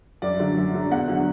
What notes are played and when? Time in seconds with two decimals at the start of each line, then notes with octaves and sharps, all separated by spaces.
0.22 F#2 D5
0.39 D3 F#3
0.57 F#2
0.74 D3 F#3
0.91 E2 F#5
1.08 D3 F#3